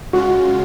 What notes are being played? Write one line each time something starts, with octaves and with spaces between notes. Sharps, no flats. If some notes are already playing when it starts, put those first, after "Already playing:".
C#3 G#3 C#4 F4 F#4